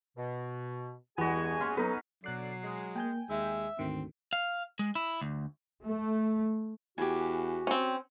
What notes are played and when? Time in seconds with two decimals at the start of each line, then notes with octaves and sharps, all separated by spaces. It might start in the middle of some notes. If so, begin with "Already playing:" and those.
0.17 B2
1.18 E2 G2 G#3 B3 F#4 G#4 G#5
1.60 C#4 C6
1.77 F#3 B3 D#4 A4 B4
2.24 B2 D3 F#3 D5 F#6 C7
2.64 G#3
2.96 A#3 G5 G#5 G6
3.30 D#2 G#3 E5
3.79 D2 G#2 D#3 C4
4.33 F5
4.79 G#3
4.95 E4
5.21 D2
5.84 A3
6.98 E2 F#4 G4 G#5
7.67 C4 C#4